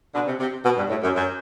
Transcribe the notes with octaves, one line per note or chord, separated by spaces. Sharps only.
B2 D3
C3
C3
B2
G2
A2
F#2
F#2